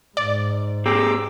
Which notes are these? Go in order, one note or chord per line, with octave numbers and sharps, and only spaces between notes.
G#2 D5
B3 G4 G#4 A#5 D6 E6